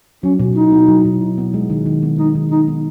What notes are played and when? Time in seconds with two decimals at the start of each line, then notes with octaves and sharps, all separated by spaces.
0.23 F#3 C#4
0.39 B2
0.55 D#4 E4
0.72 B3
0.88 F#3
1.05 B2
1.22 E4
1.38 B3
1.54 G#3
1.70 D#3
1.86 D#3
2.03 B3
2.18 G#3 D#4
2.35 D#3
2.51 D#3 D#4
2.68 B3